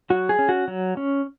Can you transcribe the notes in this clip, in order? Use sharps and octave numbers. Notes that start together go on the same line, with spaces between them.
F#3 F#4
G#4
C#4
F#4
F#3
C#4